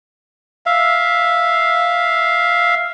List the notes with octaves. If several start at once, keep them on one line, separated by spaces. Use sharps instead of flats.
E5 F5